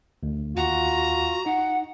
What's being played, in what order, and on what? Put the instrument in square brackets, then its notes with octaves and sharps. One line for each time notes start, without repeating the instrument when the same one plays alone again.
[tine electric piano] D2
[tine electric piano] D#2 F#5 [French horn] F4 [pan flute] F#4 [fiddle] A#5
[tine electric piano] D#4 [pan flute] F#5